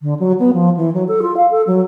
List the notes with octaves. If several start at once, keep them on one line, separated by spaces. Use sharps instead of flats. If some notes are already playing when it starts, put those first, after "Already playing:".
D3
F#3
B3
F3
E3
F#3
A4
F4
F5
A4
F#3